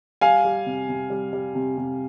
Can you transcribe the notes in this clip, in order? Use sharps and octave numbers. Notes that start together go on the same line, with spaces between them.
G3 F5 G#5
G3
C3
C3
G3
G3
C3
C3